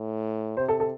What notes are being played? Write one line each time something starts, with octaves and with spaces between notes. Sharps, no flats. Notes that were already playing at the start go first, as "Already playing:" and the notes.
Already playing: A2
C3 C5
A4
A4